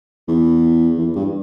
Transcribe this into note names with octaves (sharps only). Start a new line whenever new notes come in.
E2
E2
G2